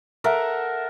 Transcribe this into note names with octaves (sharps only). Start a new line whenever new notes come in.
A4 A#4 E5 F#5